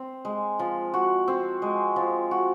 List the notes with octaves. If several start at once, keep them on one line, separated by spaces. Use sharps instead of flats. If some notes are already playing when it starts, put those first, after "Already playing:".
Already playing: C4
G#3
F3
F#4
C4
G#3
F3
F#4